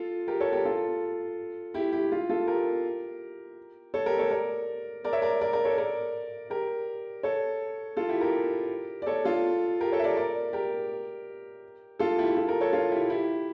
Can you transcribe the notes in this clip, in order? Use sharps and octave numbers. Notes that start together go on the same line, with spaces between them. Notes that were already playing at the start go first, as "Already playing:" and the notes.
Already playing: F4 A4
G4 A#4
A4 C#5
G4 A#4
F4 A4
E4 G4
E4 G4
F4
F4 A4
G4 A#4
A4 C#5
G4 A#4
A4 C#5
A#4 D5
A#4 D5
C#5 E5
A#4 D5
A#4 D5
A#4 D5
A4 C#5
A#4 D5
G4 A#4
A4 C#5
F4 A4
E4 G4
G4 A#4
D5
A4 C#5
F4 A4
G4 A#4
A4 C#5
E5
A#4 D5
A#4 D5
G4 A#4
F4 A4
E4 G4
F4 A4
G4 A#4
A4 C#5
F4
E4 G4
E4 G4